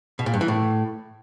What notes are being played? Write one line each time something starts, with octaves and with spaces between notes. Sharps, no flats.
B2
A#2
G2
E3
A2